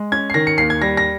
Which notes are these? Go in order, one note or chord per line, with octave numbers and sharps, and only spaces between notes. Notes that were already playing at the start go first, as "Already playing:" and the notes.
Already playing: G#3
C#4 G#6
C7
D#3 A#6
C#7
D#2 C7
G#6
G3 A#6
A#6